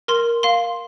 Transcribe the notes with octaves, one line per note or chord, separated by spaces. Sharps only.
A#4 C6
F5 C6